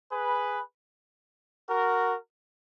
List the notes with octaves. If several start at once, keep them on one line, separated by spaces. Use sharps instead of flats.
G#4 B4
F#4 A#4